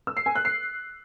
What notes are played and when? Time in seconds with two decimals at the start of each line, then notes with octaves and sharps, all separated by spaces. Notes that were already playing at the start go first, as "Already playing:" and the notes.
0.07 E6
0.17 C7
0.26 G#5
0.35 F#6
0.45 C7